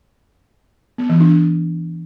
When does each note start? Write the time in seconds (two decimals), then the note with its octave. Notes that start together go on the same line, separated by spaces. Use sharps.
0.98 B3
1.09 E3
1.21 D4